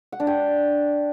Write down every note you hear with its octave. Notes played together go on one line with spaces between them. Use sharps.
F#5
D4
G5